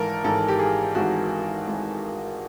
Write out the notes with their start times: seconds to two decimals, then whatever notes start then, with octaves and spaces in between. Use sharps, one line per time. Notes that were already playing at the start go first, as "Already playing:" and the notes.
Already playing: G#1 G#2 E3 A4 A#4
0.24 G#1 G#2 E3 A4
0.48 G4
0.59 G#4
0.95 G#1 G#2 E3 F#4
1.67 G#1 G#2 E3